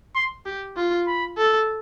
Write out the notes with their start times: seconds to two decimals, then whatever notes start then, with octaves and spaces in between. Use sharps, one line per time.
0.15 C6
0.46 G4
0.76 F4
1.07 B5
1.38 A4